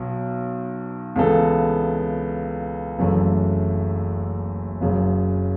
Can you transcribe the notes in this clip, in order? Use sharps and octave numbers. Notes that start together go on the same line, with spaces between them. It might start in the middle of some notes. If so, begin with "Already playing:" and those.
Already playing: B1 B2 F#3
C#2 C#3 E3 B3 A4
F#1 F#2 C#3 E3 A3
F#1 F#2 C#3